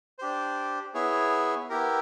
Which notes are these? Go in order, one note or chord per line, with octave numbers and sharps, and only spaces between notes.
D4 G4 C5
B3 E4 G#4 C#5
B3 E4 G4 A#4